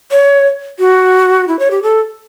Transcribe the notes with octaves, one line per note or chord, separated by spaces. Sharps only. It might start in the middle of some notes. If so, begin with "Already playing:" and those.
C#5
F#4
E4
C#5
G4
A4